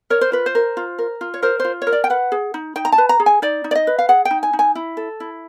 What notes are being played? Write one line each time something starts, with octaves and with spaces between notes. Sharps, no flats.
A#4 C#5
C5
F4 B4
C5
A#4
F4
A#4
F4
C#5
A#4 C5
F4 C5
C#5
A#4
D5
G5
B4 F#5
G#4
D#4
D#4 G5
A#5
A5
B4
A#5
G#4
G#5
D#4 D5
D#4
D5
D#5
B4
F5
G#4 F#5
G5
D#4
G#5
D#4
G#5
E4
A4
E4